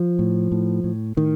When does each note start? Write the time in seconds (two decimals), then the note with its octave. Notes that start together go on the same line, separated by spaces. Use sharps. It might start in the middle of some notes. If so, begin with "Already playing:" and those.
Already playing: F3
0.19 A2
0.52 A2
0.84 A2
1.17 A2 D#3